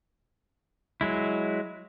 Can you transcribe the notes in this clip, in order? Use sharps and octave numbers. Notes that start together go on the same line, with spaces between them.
F#3 G#3 E4